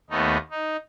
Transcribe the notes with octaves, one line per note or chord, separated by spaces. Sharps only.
D#2 A3 B3 D#4
D#4